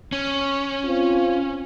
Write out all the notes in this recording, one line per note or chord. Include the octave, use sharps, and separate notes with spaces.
C#4
C4 F4